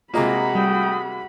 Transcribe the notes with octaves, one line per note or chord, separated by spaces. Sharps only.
C3 G#3 A#3 F4 F#4 D#5 A#5 B5
G3 A3 G5 D#6